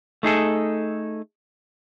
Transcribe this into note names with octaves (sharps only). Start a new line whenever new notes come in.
A3 D#4 G#4 A4